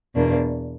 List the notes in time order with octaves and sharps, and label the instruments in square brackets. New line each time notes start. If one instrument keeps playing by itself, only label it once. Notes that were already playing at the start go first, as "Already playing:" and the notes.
[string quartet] E2 B2 A#3 D4